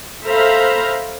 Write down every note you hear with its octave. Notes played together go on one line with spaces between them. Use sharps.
A4 C5 E5 F5 A#5 B5